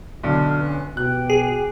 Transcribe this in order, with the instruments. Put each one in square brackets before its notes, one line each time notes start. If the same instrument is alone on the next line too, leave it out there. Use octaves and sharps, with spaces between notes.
[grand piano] B1 D3 [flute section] F#4 A5 F6
[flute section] C#4 B4 F#6
[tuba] B2 [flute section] G4 G5 [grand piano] F#6
[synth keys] G#4